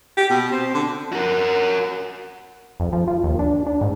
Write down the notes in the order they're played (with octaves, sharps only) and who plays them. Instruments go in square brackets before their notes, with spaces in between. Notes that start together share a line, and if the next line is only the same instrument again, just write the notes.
[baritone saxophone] G4
B2
C4
D3
[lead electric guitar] F#4 A#4
[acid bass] F2
F3
F4
D#2
D4
D4
G#2